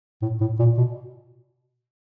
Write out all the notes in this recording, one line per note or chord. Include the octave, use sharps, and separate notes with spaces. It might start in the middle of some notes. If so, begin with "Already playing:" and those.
A2
A2
A#2
B2